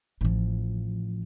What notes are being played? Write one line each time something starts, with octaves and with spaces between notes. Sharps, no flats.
A1 F3